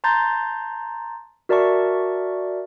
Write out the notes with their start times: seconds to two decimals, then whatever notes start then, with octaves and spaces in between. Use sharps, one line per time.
0.04 A5 A#5 C6 G6 A6
1.49 F#4 A#4 D5 E5 A5 C#6